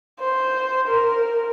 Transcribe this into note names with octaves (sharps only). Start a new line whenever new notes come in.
C5
A#4